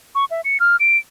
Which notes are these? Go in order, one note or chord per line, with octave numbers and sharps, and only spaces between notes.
C#6
E5
C#7
F6
D7